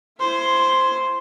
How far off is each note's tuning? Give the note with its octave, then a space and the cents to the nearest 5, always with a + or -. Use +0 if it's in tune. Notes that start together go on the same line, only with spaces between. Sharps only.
E4 +25 C5 +0